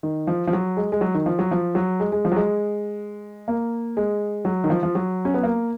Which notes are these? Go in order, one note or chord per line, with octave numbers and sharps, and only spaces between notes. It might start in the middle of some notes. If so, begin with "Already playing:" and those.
D#3
F3
F3
F#3
G#3
G#3
F#3
D#3
F3
F#3
F3
F#3
G#3
G#3
F3
F#3
G#3
A#3
G#3
F#3
D#3
F3
F3
F#3
C#4
B3
A#3